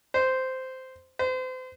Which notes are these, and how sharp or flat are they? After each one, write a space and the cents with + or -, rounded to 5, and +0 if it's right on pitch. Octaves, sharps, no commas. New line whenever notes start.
C5 -10
C5 -35